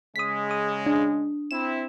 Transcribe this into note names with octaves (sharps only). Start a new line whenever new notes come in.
C#3 G#3 D#6 B6
D#6
D4
C4 E4 E7